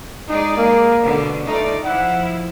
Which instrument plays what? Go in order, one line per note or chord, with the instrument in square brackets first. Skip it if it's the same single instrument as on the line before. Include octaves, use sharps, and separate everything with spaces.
[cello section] G#3 G#4 D5 [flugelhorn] D#4
[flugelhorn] A#3
[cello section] B2 D3
[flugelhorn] A3 [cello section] D#4 F4 D5
[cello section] F3 E4 [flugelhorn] F#5